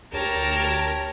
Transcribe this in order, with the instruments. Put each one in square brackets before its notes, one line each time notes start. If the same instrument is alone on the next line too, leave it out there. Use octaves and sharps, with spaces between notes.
[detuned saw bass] D2 [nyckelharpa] G4 C#5 [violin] A#4 A#5 [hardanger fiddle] A5